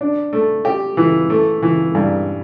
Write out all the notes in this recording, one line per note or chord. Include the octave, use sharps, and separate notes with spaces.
D4
A3
G4
E3
A3
E3
G2